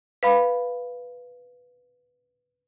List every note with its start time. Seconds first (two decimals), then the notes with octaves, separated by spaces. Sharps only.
0.23 B4 F5 B5